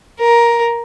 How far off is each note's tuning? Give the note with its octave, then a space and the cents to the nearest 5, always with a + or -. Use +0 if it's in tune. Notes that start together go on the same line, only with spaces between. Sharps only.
A#4 +10